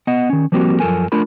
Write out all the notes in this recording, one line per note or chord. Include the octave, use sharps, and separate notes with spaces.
B3 D#5 F#5
D#3 C#4
F3 G3 A#3 C4 C#4 F#4
F#2 F3 A4 A#4 G#5
A3 D4 F4 A#4 B5